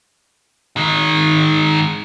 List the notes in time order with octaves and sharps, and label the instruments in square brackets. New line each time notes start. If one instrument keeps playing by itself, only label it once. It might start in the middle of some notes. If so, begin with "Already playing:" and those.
[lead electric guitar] D#3 G#3